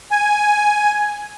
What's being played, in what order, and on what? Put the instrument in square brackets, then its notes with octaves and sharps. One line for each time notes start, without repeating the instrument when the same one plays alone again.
[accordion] G#5